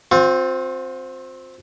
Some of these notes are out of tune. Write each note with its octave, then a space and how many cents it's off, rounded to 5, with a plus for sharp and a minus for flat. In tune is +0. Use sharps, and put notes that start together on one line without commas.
C4 +0 F4 +45